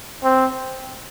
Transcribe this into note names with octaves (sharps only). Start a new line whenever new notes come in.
C4